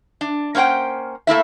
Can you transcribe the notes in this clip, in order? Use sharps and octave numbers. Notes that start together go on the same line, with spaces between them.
D4
A#3 C#4 C5 F#5 G5
A3 A#3 E4 E5